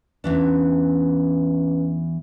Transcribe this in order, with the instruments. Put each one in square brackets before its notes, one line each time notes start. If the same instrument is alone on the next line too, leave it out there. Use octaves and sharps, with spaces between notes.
[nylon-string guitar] E2 E3 D4 [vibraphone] C#4 B4